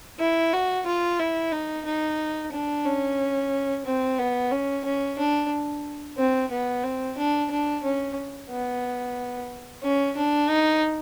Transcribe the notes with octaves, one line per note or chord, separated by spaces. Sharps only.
E4
F#4
F4
E4
D#4
D#4
D4
C#4
C4
B3
C#4
C#4
D4
C4
B3
C4
D4
D4
C#4
B3
C#4
D4
D#4